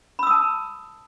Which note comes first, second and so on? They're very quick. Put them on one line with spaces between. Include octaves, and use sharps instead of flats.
B5 E6 D#6 A5